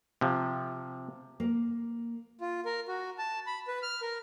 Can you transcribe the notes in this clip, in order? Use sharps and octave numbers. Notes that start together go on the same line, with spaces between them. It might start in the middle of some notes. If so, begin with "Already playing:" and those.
C3 F3
A#3
F4
A#4
F#4
A5
B5
B4
F6
A#4